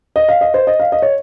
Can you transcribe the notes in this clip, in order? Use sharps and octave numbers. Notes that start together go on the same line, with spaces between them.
D#5
F5
D#5
C5
D#5
F5
D#5
C#5